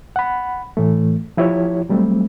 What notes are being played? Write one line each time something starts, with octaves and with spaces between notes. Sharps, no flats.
F#5 B5
A2 E3 A3
F3 E4 G4 C#5
F#3 G3 A3 C4